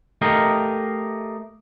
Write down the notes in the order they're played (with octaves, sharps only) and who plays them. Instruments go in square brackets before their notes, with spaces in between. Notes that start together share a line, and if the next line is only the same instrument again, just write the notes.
[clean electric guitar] A3 G4 A#4 D#5 F5